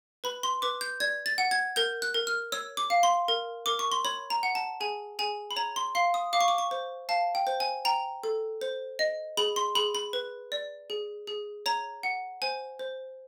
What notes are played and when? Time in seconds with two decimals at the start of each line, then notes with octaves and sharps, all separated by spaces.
0.24 B4 B5
0.43 C6
0.62 B4 D6
0.81 G6
1.00 D5 G#6
1.26 A6
1.38 F#5
1.51 G#6
1.76 A#4 G6
2.02 F#6
2.14 A#4
2.27 F6
2.52 C#5 E6
2.77 D6
2.90 F5
3.03 C6
3.28 A#4
3.66 A#4 D6
3.79 C#6
3.92 C6
4.05 C#5 B5
4.30 A#5
4.43 F#5
4.55 A5
4.80 G#4 G#5
5.19 G#4 G#5
5.51 B5
5.56 C#5 A#5
5.76 C6
5.95 F5 C6
6.14 D#6
6.33 F5 D6
6.41 C#6
6.48 D6
6.58 C#6
6.71 C5
7.09 F5 A5
7.35 G5
7.47 C5
7.60 G#5
7.85 G5 A#5
8.23 A4
8.61 C5
8.99 D#5
9.37 G#4 B5
9.56 C6
9.75 G#4 B5
9.95 B5
10.13 B4
10.52 D5
10.90 G#4
11.27 G#4
11.66 C#5 A#5
12.03 F#5
12.42 C5 G#5
12.79 C5